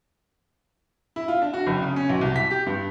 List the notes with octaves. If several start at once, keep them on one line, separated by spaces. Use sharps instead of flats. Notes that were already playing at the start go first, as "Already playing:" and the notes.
E4
F4
D4
F#4
F#1
C#3
C#4
B1
C2
B6
G4
G2